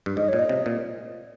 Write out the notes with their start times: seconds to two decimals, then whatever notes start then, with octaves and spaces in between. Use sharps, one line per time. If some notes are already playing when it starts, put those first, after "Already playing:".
0.06 G2
0.17 G#2 D#5
0.28 A#2 C#5
0.39 D#5
0.49 C3
0.66 A#2